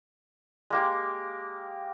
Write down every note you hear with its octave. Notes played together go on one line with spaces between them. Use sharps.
G#3 A#3 G4